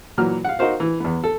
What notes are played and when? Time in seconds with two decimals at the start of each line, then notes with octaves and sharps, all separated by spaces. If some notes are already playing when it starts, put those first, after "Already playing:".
0.18 A#2 E3 F#3 F6
0.45 F5 F#5
0.59 D#4 F#4 A#4 C5 F5
0.80 E3
1.00 E2 B3
1.24 A4